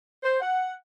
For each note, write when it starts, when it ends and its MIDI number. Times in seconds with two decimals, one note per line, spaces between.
0.23 0.36 72
0.40 0.71 78